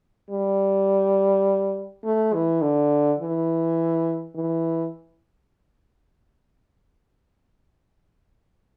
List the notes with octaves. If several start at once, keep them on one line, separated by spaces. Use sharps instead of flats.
G3
A3
E3
D3
E3
E3